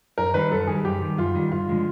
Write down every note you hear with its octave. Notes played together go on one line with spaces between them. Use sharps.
F#2 A#4
D#3 G3 B4
F#2 A4
D#3 G3 G#4
F#2 G4
D#3 G3
F#2 F4
D#3 G3
G2 F4
D3 F3 G#3